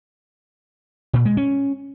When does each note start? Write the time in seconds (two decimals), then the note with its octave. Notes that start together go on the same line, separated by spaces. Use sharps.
1.13 A#2
1.25 G#3
1.37 C#4